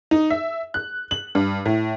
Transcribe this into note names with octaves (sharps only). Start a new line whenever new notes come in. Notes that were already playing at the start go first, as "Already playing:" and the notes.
D#4
E5
F#6
F#7
G2
A2